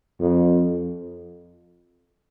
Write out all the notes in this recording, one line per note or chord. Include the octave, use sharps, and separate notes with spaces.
F2